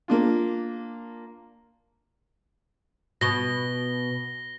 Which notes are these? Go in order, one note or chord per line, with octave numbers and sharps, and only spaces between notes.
A#3 D4 F4
B2 A#6 G7